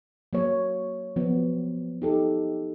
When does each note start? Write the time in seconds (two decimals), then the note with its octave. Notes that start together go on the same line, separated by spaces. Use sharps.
0.33 F#3 A#3 C#5
1.16 F3 F#3 B3
2.02 D#4 G4 A4